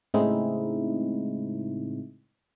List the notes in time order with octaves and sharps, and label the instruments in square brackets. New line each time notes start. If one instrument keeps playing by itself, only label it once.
[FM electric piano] A2 C#3 G#3 C4 D#4 E4